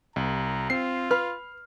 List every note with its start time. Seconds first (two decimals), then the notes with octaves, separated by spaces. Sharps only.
0.16 C2 A#5
0.70 C4 F4 C7
1.11 B4 F6